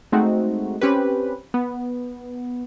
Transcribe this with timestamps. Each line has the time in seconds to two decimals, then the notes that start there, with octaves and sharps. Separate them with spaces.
0.12 G#3 A3 C4 D#4 F#4
0.81 C4 C#4 G4 B4
1.54 B3